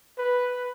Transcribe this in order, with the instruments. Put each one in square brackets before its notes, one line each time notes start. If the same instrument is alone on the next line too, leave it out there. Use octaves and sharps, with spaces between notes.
[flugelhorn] B4